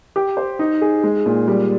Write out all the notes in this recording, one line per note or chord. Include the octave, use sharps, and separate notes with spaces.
G4
C5
D#4
G#4
G#3
A#2
G3